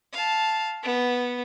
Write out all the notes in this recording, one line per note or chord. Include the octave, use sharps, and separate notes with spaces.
F5 A5
B3